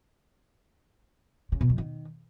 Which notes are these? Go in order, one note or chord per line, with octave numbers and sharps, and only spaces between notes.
C#3
B2
F2
D#3